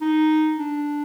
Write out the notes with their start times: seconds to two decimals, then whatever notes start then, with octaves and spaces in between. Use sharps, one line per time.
0.01 D#4
0.57 D4